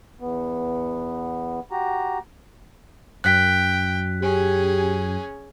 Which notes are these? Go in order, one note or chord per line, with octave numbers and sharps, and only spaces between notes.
E2 B3
F#4 G4 A#5
F#2 G5 F#6 B6
C#4 G4 G#4